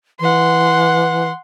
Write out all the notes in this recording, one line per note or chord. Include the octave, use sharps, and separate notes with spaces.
E3 F#5 C6